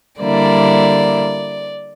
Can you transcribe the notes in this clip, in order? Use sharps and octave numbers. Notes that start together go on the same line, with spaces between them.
D3 G3 A#3 E4 D5